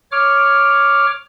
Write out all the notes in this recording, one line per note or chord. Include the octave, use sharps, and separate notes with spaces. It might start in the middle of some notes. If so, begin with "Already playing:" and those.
C#5 D6 F6